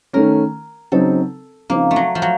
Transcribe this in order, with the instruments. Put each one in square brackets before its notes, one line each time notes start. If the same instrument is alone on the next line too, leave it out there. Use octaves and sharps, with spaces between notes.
[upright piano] D#3 A3 C#4 [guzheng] A#4
[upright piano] C#3 F#3 C4 D#4 [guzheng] A4
[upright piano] C#3 F3 C4 D#4 [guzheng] A#3
[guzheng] A3
F#3
F3
F#3